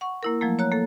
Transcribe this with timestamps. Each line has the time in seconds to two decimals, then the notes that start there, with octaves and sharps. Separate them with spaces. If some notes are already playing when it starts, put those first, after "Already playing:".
0.01 F#5 C#6
0.23 A#3 E4 A#4
0.41 F3 F#3 A3 A#3
0.59 C#5 A#5 F#6
0.71 A#3 A4